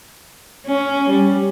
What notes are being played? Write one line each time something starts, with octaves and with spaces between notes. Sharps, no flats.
C#4
G3